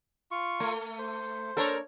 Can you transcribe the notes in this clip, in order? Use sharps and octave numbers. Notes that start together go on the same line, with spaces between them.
F4 C#6
A3 A#4
C5
A#3 D4 A4 A#4 C#5